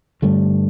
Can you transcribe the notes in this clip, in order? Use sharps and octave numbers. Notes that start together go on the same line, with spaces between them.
G2 D3 G3 A3